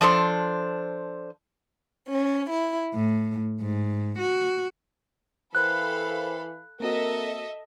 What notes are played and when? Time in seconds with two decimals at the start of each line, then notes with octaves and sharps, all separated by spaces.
0.01 F3 D4 A4 C5
2.07 C#4
2.48 E4
2.92 A2
3.59 G#2
4.17 F#4
5.55 E3 A4 A#4 C5 F5 G5 B5 F#6
6.80 A#3 C4 F#4 A4 A#4 D#5 E5